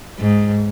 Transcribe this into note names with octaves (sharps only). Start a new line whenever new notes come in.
G#2